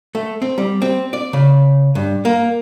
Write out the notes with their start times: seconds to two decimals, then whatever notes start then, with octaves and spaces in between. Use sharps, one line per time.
0.15 A3
0.42 C4
0.58 G3
0.82 C4
1.13 D5
1.33 C#3
1.95 G2
2.25 A#3